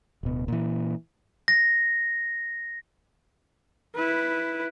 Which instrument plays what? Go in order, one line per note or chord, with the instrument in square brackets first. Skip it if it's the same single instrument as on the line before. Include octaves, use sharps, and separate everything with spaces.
[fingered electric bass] D1 B2
A#2 E3
[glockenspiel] A#6
[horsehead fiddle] E4 B4